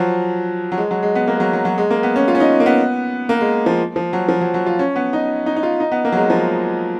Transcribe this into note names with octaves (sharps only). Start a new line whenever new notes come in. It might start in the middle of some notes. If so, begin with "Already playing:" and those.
Already playing: F3 F#3
F#3
G#3
F#3
G#3
B3
A#3
G#3
F#3
F#3
F#3
G#3
A#3
B3
C#4
F4
C#4
D#4
A#3
B3
A#3
G#3
F3
F3
F#3
F3
F#3
F#3
F4
C#4
B3
D#4
D#4
D#4
F4
D#4
B3
A#3
F#3
G#3
F3